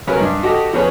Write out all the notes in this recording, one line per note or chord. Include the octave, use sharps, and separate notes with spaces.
C#3 F#3 C#4 A#4 B4
G2 D4 D#4
F#4 G4 A4 D#5
F3 B3 C#4 G#4 B4 C#5